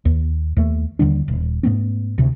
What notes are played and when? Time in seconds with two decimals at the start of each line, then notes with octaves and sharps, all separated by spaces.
0.05 D#2
0.57 D#2 A3
0.99 D#2 D3 G3 D4
1.28 D#1
1.63 G#2 A3 B3 C#4
2.18 D2 C3